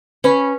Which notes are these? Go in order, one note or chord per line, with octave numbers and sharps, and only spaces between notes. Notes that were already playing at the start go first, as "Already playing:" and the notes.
C#4 B4 B5